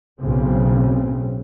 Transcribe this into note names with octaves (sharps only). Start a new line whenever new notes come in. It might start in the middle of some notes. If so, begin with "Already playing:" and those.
B1 A2 C#3 C4